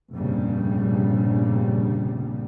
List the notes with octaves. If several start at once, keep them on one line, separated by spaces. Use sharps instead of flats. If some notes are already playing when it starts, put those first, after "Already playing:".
F1 A#1 G2 C#3 G3